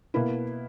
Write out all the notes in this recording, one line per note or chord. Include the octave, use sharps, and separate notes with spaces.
B2 A#3 E4 B4